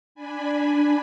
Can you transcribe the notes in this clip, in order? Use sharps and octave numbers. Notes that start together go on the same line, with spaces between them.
D4 G#5 B5